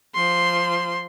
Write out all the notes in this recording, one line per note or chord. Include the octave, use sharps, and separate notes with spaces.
F3 C6